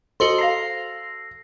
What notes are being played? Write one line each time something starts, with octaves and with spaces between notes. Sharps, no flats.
F#4 A4 C5 D#5 C6 D#6
F5 A#5 A#6 C7